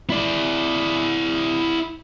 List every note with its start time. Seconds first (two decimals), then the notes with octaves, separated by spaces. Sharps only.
0.10 E4 D5